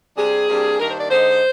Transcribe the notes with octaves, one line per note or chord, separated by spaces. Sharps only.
C3 G3 D4 G#4
C3 G3 A#3 D4
G2 D#3 A#3 D4 A#4
C5
D5
D3 G#3 D#4 C5